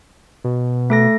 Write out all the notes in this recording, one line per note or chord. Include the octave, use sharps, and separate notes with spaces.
B2
A3 A4 A#6